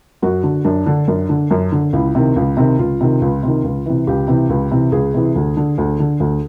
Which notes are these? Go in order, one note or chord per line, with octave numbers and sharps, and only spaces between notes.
F#2 F#4
D3
F#2 D4
D3
F#2
D3
F#2
D3
C#2 E4
C3 D#3
C#2
C3 D#3
C#2 F4
C3 D#3
C#2
C3 D#3
C#2
C3 E3
C#2 G4
C3 E3
C#2
C3 E3
C#2 G#4
C3 E3
D2
D3
D2
D3
D2